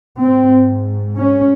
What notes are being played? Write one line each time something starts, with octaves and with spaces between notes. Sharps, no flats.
G#2 C4
C#4